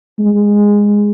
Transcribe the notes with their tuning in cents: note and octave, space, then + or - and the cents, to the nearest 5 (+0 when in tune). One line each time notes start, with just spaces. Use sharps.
G#3 -15